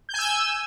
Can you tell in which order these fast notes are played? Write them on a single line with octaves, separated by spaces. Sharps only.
G6 G#5 E6